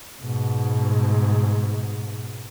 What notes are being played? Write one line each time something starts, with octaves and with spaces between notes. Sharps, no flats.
G#2 B2